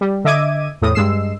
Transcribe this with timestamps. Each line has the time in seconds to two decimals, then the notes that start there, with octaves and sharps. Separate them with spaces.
0.01 G3
0.24 D3 D#5 E5 D6 G#6 D#7
0.82 E2 A2 D#6
0.94 G2 G#3 E6 C7 E7